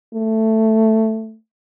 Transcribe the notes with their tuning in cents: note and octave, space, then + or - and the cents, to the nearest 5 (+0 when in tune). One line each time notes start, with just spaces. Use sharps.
A3 +5